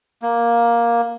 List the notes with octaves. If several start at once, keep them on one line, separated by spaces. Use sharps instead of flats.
A#3